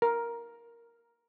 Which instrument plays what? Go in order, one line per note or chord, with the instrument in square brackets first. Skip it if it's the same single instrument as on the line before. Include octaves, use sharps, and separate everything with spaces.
[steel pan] A#4